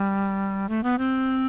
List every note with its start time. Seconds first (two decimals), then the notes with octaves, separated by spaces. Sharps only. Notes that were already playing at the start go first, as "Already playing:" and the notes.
Already playing: G3
0.69 A3
0.84 B3
0.98 C4